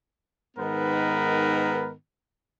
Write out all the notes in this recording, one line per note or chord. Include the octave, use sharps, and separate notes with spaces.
G#2 D#3 B3 A#4 B4